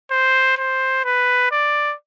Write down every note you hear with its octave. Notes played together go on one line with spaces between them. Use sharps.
C5
C5
B4
D5